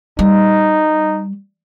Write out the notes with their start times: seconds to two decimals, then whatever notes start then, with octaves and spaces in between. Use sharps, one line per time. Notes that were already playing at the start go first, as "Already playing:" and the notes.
0.19 G3 D#4